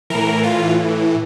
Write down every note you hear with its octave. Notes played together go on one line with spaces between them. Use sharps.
A2 E3 A#4
F4